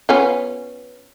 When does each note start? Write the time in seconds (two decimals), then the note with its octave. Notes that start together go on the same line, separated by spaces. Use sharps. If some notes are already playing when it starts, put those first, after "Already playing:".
0.09 B3 C#4 F4